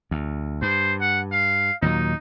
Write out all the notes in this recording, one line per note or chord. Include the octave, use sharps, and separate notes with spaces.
D2
G2 C5
F#5
F5
D#2 A#2 F#3 D#4